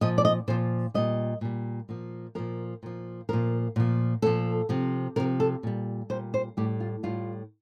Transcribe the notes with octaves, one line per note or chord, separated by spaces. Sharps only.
A#2 F3 D#5
D5
D#5
A#2 F3 C5
A#2 G3 D#5
A#2 G3
A#2 F3
A#2 F3 A#4
A#2 F3
A#2 F3 A#4
A#2 F3
A#2 F3 A4
C3 F3
C3 F3 A#4
A4
A#2 G3
A#2 G3 C5
C5
A2 G3 G4
F4
A2 G3 F4